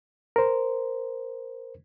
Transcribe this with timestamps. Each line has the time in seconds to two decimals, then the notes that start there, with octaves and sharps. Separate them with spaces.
0.36 A#4 C5